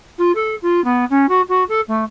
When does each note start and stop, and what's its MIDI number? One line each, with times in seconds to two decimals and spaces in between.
0.18 0.32 65
0.35 0.55 69
0.62 0.83 65
0.84 1.05 59
1.10 1.26 61
1.29 1.41 66
1.49 1.64 66
1.69 1.81 69
1.88 2.04 57